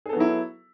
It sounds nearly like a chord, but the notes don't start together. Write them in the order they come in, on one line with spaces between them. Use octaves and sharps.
G#4 A4 B3 F#3 E4